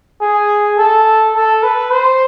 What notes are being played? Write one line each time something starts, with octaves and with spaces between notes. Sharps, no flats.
G#4
A4
A4
B4
C5